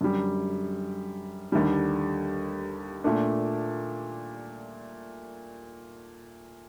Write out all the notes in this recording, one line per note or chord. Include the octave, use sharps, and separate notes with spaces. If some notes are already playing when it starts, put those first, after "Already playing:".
F#2 D3 G3
D#2 D3 G3
A#2 A3 D4